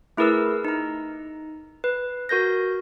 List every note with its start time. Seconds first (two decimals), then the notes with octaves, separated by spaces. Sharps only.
0.17 A3 E4 G#4 A#4 B4 E6
0.65 D#4 A#5
1.84 B4
2.29 F#4 A#4 G6 A#6